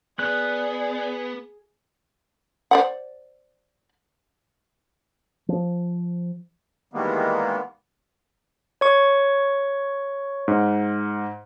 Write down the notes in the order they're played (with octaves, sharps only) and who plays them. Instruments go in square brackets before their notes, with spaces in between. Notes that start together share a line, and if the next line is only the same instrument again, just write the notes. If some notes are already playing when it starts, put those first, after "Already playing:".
[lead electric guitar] B3 [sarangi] G#4 [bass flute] D5 [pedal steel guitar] F#6
[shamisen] C5 D5 F#5
[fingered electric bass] F3
[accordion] D#3 E3 G3 G#3 A#3 B3
[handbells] C#5 C#6
[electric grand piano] G#2